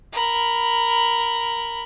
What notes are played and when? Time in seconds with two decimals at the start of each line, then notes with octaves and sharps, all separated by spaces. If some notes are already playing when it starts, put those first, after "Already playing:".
0.12 A#4 B5